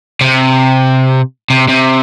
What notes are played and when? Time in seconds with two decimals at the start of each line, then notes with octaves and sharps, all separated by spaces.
0.21 C3
1.50 C3
1.68 C3